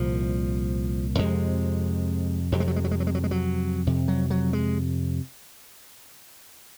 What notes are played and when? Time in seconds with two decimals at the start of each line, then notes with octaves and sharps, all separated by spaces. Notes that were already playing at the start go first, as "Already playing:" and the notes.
Already playing: C2 A#2 F3
1.19 F2 C3 G#3
2.52 F2 C3 F#3
2.60 G#3
2.68 F#3
2.76 G#3
2.84 F#3
2.91 G#3
3.00 F#3
3.07 G#3
3.15 F#3
3.24 G#3
3.31 F#3
3.87 F2 C3
4.08 F#3
4.30 F#3
4.53 G#3